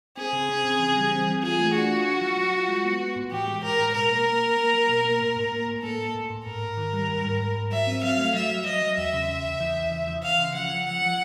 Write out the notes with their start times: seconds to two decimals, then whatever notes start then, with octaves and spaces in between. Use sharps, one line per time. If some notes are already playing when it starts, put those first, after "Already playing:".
0.17 C4 G#4
0.33 C#3
0.49 C4
0.64 C#3
0.80 E3
0.96 G3
1.11 C4
1.27 E3
1.43 F4 G#4
1.59 A3
1.74 D4 F#4
1.90 F4
2.06 F4
2.22 F#3
2.37 F#3
2.53 F4
2.68 G#3
2.85 B3
3.00 B3
3.16 A2
3.31 E3 G4
3.48 G#3
3.63 A2 A#4
3.78 G#3
3.94 B2 A#4
4.11 A#3
4.26 A#3
4.42 A#3
4.57 A#3
4.73 F#3
4.89 B2
5.04 A#3
5.20 A2
5.36 A2
5.52 A#3
5.68 A2
5.83 A#3 A4
5.99 A#3
6.15 A2
6.30 A2
6.46 G#2 A#4
6.62 G#2
6.77 D#3
6.93 G3
7.09 G#2
7.24 G#2
7.41 G#2
7.56 G#2
7.71 F#3 E5
7.87 C4
8.03 F#3 F5
8.19 A3
8.34 F#3 E5
8.50 F#3
8.66 F#3 D#5
8.82 F#3
8.97 E2 E5
9.14 C#3
9.29 C#3
9.45 E2
9.60 E3
9.76 E2
9.92 C#3
10.07 E3
10.23 C#3 F5
10.39 C#3
10.55 F3 F#5
10.70 F3
10.86 F3 F#5
11.02 F3